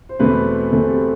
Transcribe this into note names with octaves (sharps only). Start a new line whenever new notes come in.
C5
E2 B2 A3 C4 B4
E2 B2 A3 C4 A4
G4